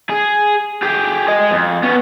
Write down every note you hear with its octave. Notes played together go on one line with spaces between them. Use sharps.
G#4
G4 G#4
G#4 D#5
F2
B3 C#4